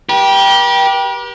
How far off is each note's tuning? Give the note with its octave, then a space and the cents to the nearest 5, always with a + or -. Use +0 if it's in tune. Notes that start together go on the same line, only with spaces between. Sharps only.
G4 +0 B4 -45